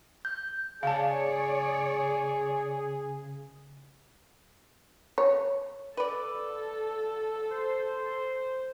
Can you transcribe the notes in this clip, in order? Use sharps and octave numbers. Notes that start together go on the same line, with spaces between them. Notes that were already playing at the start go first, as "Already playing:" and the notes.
G6
C#3 G#4 C#5 D5 F5 A5
C#5
A4 B4 D5
C5